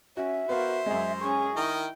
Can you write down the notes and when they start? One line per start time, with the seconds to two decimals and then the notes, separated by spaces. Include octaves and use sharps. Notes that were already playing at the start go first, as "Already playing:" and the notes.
0.17 C#4 F#4 E5
0.49 B3 F#4 A#4 C5 F5
0.86 F#2 G#3 G#4
1.21 C#4 G#4 C#6
1.56 D#3 E4 A#4 D#5 G5